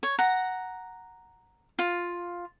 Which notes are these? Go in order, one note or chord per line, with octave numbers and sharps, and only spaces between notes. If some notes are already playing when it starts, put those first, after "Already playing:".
C#5
F#5 A#5
F4